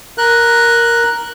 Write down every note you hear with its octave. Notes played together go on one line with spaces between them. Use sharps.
A#4 F#6